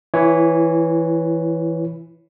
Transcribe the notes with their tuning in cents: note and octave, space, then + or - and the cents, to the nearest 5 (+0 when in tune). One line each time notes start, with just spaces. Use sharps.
E3 +0 E4 +30 C#5 +0